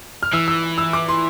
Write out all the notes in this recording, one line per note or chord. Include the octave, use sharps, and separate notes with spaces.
F6
E3 E6
E6
E6
D6
C6